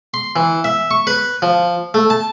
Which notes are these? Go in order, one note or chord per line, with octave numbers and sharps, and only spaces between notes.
C6
E3
E5
C#6
B4
F3
A3
A5